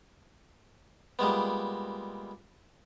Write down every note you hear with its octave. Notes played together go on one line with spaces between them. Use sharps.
A#2 G3 G#3 B3